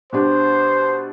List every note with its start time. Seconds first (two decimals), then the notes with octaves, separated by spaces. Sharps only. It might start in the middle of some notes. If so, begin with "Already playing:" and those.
0.12 B2 G3 D4 G4 C5